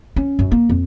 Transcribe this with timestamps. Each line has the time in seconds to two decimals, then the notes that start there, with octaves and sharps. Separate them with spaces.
0.16 C#4
0.39 F#2
0.52 A#3
0.69 F2